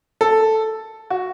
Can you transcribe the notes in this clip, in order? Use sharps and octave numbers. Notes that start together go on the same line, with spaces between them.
A4
F#4